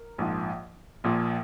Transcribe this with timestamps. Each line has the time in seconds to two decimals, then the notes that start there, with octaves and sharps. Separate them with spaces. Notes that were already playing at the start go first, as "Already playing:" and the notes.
Already playing: A#4
0.18 A#1 G#2 F3
1.04 A#1 A#2 F3